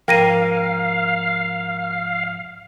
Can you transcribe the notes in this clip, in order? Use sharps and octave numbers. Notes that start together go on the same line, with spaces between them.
G#2 F3 A#3 F5 G5 A#6 D#7